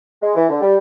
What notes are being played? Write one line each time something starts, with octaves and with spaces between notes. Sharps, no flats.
G#3
E3
D3
G3